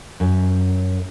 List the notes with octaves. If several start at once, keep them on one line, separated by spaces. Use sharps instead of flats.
F#2